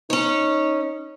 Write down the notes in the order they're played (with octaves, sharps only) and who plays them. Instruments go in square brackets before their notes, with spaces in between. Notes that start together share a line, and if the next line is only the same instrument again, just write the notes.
[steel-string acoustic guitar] C#4 C#5 [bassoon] D#4